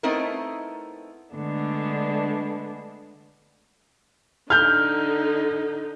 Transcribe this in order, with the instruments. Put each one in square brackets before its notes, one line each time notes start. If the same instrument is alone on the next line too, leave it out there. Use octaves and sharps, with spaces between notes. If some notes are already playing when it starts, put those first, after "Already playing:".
[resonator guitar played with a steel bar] A3 B3 C4 D#4 E4 A#4
[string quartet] D3 G#3 A3 B3 D4
[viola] D3 D#4 [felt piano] F6 G6